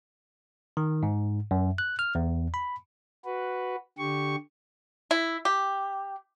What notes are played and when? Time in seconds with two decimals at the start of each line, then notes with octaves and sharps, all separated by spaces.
0.77 D#3
1.03 G#2
1.51 F#2
1.78 F#6
1.99 F6
2.15 E2
2.54 B5
3.25 F#4 B4
3.98 D3 G4 C#6
5.11 E4
5.45 G4